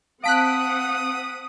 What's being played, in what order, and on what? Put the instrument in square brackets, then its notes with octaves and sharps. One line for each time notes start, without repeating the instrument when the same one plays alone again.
[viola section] C4 F#5 [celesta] F5 A5 [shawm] D#6 [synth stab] F#6 B6 D7